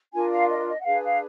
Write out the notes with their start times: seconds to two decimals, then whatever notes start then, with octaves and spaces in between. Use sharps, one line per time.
0.12 D4 F4 A#4 G#5
0.30 F5
0.49 D#5
0.67 D#5
0.81 F#5
0.84 D4 G#4 B4 F5
1.03 F5